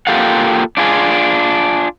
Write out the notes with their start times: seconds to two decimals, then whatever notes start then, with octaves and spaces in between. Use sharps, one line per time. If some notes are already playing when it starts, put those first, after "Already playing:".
0.07 A#3 F4 G4 A4 F5 F#5
0.77 D4 F4 G#4